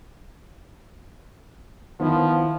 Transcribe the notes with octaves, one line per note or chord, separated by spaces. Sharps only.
D#3 F3 B3 E4